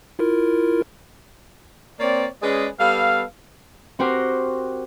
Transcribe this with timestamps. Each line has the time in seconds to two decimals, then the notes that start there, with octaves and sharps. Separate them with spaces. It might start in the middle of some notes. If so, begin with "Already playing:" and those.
0.19 E4 F4 A#4
2.00 A#3 C4 C#5 D5
2.42 G#3 C#4 G#4 B4 D5 D#5
2.79 G3 B3 A4 F5
3.99 C4 F#4 G4 A#4 C5